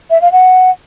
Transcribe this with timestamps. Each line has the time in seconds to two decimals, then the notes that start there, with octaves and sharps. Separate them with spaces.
0.10 E5
0.22 F5
0.32 F#5